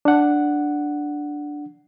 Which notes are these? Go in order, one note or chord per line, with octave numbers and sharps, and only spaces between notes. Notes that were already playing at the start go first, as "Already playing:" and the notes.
D4 F#5